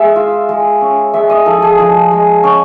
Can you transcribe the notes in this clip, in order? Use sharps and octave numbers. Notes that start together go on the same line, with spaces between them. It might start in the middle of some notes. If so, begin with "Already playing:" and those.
Already playing: G#3 E5
F4
G#3
C#4
G#3 E5
D#5
F3 A4
G#4
F3
G#3
C#4